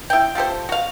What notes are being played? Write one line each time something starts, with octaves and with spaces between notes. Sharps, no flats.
E4 G5
F4 G4 A4 C5
F#4 F5